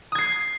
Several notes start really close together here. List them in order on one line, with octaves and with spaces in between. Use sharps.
D#6 G#6 C7